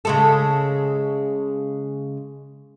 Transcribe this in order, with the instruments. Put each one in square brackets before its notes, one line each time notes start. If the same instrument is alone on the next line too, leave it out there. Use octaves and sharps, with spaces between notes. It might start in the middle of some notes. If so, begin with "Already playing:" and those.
[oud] C#3 G#3 A4